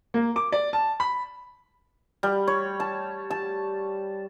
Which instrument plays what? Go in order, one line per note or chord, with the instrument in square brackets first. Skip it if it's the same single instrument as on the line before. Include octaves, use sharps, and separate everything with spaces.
[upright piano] A#3
D6
D5
A5
B5
[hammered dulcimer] G3
C#5
A5
A5